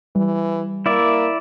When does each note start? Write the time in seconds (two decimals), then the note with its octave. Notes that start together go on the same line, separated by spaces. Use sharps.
0.15 E3 G3
0.86 A#3 E4 D5 E5